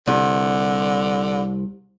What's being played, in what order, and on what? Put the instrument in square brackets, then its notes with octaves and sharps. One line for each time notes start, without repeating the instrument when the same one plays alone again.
[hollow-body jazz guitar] C2 [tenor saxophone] D3